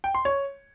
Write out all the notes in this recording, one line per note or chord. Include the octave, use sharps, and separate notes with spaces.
G5
C6
C#5